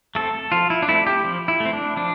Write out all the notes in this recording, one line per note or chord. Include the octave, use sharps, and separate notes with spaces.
A3 C4 A4
F3 F4
E4
D4
A3 C4 E4
G4
F3
E4
A3
C4
D4
F3 D4